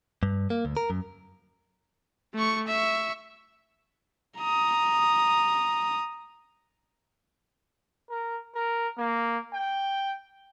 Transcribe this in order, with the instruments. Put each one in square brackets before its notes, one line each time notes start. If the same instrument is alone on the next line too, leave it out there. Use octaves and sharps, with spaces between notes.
[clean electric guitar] G2
A#3
D2
A#4
F#2
[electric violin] A3 C#6
E5 C#6
A#5 D#6
[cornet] A#4
A#4
A#3
G5